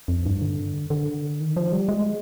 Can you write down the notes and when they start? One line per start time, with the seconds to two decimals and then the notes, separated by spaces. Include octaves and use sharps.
0.08 F2
0.26 G2
0.42 D3
0.90 D3
1.40 D#3
1.57 F3
1.72 G3
1.89 G#3